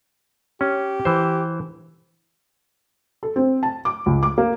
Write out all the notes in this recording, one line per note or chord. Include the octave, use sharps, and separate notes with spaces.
C#4 G4
E3 C5
A4
C4
A5
D6
C#2
D6
A#3